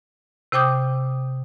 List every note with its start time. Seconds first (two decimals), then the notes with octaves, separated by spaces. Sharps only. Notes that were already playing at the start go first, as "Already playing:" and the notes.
0.52 C3 C5 G5 D6 D#6 G6